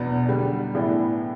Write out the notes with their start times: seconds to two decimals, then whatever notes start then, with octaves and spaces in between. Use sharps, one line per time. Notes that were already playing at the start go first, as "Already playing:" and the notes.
Already playing: E2 B2 B3 D4
0.29 D3 G3 B3
0.75 A2 E3 B3 D4